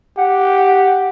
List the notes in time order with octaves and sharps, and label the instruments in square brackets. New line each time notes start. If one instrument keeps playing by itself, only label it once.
[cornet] G4 [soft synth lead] F#5